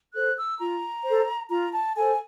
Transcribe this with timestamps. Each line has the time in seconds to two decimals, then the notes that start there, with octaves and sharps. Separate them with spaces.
0.14 A4 C5 F#6
0.37 E6
0.59 F4 A#5
1.04 A4 C5
1.50 F4 A#5
1.72 A5
1.96 A4 C5 G#5